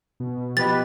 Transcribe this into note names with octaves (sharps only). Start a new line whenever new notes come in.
B2
F3 B3 G4 B4 D#5 A6